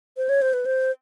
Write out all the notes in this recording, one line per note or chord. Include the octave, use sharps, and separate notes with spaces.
C5
C#5
C5
B4
C5